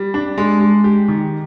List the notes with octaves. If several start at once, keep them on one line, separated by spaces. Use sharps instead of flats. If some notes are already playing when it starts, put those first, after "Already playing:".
Already playing: G3
D4
G#3
G#3
G4
D#3